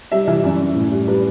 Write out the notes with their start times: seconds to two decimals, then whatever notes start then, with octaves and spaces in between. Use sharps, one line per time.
0.12 G3 E5
0.27 E3 E5
0.44 F#2 D5
0.60 F#2
0.75 A2
0.92 G3
1.08 G3 B4